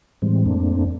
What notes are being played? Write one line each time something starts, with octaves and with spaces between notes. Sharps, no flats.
A2 E3 G3 G#3 C4
F2 A3 A#3 C4 D4